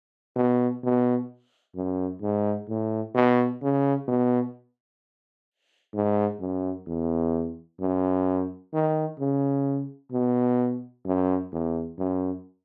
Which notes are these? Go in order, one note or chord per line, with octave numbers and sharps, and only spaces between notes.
B2
B2
F#2
G#2
A2
B2
C#3
B2
G#2
F#2
E2
F#2
D#3
C#3
B2
F#2
E2
F#2